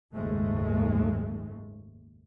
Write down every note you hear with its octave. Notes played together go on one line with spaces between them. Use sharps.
F#1 D#2 G#2 G#3 A3